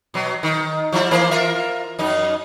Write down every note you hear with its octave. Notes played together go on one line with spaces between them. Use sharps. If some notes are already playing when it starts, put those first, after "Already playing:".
B2 F#3
D#3
F3 G3 E4
E3 A#3 C5
F4 A#4 E5
F#2 D#4